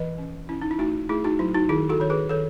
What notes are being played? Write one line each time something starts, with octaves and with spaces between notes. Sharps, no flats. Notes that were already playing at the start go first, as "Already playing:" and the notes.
Already playing: E3 B4 D#5
C#4
C#4 E4
D#4
E4
A3 D#4 F#4
A3 E4 G#4
D#4 F#4
F#3 E4
D#4 F#4
D#3 E4 G#4
F#4 A4
D#3 C#5
G#4 B4
D#3 A4 C#5